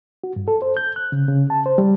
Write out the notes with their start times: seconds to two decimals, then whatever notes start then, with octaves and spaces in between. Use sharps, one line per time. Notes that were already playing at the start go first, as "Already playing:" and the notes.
0.24 F#4
0.36 G2
0.48 A4
0.62 C5
0.77 G6
0.96 F#6
1.12 C#3
1.28 C#3
1.50 A5
1.66 C5
1.78 G3